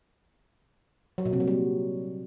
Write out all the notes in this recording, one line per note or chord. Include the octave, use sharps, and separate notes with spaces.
F#3
A#2
C3
F#3
G3